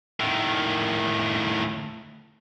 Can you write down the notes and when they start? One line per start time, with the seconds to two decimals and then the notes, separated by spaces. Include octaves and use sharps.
0.20 A2 D#3